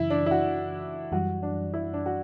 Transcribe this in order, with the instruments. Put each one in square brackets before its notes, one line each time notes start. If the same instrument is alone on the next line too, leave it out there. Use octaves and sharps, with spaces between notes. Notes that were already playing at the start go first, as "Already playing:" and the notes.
Already playing: [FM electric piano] F#2 C#3 E3 [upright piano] E4
[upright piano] D4
E4
F#4
[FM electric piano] F#2 E3 G3 [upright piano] F#4
[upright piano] D4
E4
D4
F#4